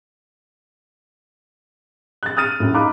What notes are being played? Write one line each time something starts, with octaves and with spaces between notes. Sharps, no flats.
F#6 A6
D#6 F6 A6 D#7
F#2 A2
D#4 F5 A#5 B5 D6 F#6